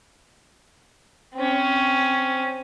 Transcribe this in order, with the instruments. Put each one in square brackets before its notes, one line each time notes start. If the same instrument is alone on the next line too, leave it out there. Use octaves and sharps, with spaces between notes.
[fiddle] C4 C#4